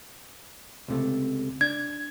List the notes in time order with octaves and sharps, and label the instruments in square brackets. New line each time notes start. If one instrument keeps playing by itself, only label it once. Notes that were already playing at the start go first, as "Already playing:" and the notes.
[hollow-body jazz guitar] C#2 C3 A3
[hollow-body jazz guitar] D4 [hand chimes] G#6